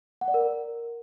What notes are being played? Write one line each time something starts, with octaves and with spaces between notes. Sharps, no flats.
F#5
D5
A#4